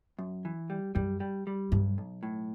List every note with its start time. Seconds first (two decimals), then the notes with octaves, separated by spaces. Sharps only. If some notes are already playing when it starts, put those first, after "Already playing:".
0.18 F#2
0.45 E3
0.70 G3
0.95 F#2 G3
1.20 G3
1.47 G3
1.72 B1 G2
1.98 B1
2.23 A2